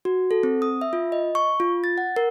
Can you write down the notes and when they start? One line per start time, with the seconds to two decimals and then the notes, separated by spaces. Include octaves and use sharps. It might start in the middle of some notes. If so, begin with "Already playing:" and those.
0.05 F#4
0.31 A4
0.43 C4
0.62 D#6
0.81 E5
0.93 F4
1.12 D#5
1.35 C#6
1.60 F4
1.84 A6
1.98 F#5
2.16 A#4